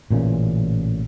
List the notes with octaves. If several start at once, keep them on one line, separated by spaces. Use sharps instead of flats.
A1 A#2 C#3 E3